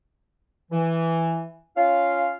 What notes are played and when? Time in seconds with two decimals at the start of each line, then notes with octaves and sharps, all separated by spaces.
0.71 E3
1.76 C#4 F4 F5